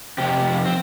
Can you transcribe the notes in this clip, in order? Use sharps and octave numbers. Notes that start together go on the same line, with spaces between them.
F2 C3 G4
C4